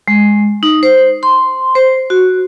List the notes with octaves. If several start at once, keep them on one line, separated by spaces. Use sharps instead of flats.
G#3
D#4
C5
C6
C5
F#4